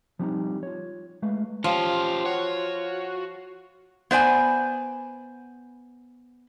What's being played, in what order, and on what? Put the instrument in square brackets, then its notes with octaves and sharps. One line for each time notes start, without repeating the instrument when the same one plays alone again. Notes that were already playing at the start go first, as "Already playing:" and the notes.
[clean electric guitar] F3 G3 C4 C#4 D#4
F4 C#5
G#3 A3 B4 F5
[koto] F3 [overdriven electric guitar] C#4 G4 [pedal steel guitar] F4
[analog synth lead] F#4 [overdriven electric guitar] C#5
[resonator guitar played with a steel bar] B3 C5 D5 G#5